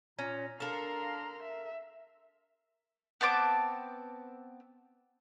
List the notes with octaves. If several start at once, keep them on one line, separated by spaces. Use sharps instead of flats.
A#2 C#4 A#5
D4 A4 A#4 F5 A#5 C6
E5
B3 C4 A5 D6